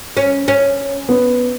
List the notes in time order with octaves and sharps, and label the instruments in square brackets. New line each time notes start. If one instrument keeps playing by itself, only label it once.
[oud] C#4
C#4
[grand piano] B3